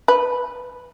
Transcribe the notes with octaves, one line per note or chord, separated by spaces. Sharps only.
B4